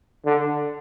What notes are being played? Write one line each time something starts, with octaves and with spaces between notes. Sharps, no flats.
D3